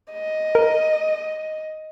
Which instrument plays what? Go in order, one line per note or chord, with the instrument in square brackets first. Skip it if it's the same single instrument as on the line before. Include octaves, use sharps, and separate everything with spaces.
[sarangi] D#5
[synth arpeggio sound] A#4